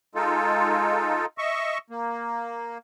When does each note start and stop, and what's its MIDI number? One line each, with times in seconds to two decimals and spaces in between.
0.15 1.25 56
0.15 1.25 63
0.15 1.25 65
0.15 1.25 69
1.38 1.78 75
1.38 1.78 76
1.38 1.78 85
1.90 2.78 58